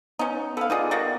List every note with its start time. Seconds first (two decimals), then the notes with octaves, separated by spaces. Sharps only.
0.19 B3 C#4 D#4
0.57 B3 A4 F5
0.70 B3 D#4 F4 G#4 D5 D#5
0.91 G3 A#3 F#4